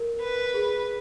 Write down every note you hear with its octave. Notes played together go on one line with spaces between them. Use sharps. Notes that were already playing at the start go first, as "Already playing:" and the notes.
Already playing: A#4
B4
G#4